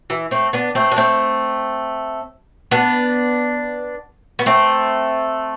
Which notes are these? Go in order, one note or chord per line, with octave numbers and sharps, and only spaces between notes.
E3
A3 C4
B3 D4
A3 C4
D4
A3 C4
B3 D4
B3
A3 C4